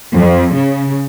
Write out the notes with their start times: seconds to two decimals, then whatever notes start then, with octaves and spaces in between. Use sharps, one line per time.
0.16 F2
0.53 C#3